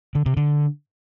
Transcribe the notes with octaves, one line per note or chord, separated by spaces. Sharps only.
D3
C3
D3